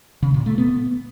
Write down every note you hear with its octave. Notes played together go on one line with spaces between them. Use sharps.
C#3
A#2
A3
B3